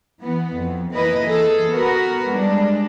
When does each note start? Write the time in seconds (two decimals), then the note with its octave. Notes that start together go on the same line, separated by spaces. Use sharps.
0.21 E3 B3
0.56 F2
0.92 E3 A#3 E4 B4 D#5
1.28 E3 G#4 A4
1.69 B3 F#4 A#4 B4
2.31 G3 G#3 D4